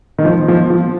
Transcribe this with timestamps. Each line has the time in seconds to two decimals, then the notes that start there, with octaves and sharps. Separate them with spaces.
0.19 D#3
0.25 F3
0.48 F3
0.70 F3